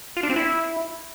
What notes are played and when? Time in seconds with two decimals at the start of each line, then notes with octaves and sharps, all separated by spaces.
0.17 F4
0.23 D4
0.30 C4
0.36 E4